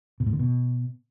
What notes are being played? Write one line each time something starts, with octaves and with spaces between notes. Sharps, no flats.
B2
A2
D3
B2